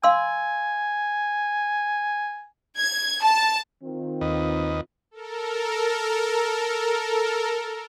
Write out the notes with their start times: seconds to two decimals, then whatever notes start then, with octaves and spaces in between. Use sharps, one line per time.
0.03 F5 G#5 C6 E6
2.78 G#6
3.23 A5
3.83 D#3 C4 F4
4.21 D#2 B4 D#5
5.11 A4 A#4